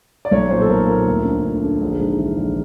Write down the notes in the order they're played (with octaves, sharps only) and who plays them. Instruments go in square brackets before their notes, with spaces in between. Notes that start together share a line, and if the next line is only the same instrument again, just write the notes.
[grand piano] D5
B1 C#5
A#2 C5
A4
B1 A#4
A#2 A#4
D2
D3
D2
D3
A#1
G#2
E3
A#1